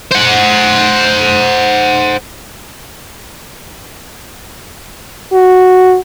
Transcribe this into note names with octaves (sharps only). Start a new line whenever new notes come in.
C5 F#5
F#4